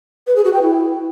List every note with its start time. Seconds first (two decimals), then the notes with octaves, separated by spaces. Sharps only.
0.27 B4
0.36 G#4
0.45 F#4
0.53 G5
0.62 E4